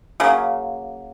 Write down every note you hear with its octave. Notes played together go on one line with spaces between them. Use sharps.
C#3 F#3 A#3